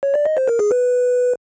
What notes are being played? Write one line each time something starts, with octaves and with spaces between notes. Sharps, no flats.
C#5
D5
D#5
C5
A#4
G#4
B4